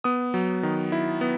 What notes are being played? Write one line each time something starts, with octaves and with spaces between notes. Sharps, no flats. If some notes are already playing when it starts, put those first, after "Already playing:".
B3 D#6
F#3
D#3
E4
B3